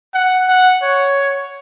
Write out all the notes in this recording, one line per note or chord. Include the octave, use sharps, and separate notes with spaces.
F#5
F#5
C#5